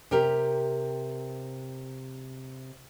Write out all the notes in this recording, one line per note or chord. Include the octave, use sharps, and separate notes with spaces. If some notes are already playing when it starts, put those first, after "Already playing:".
C3 G4 A#4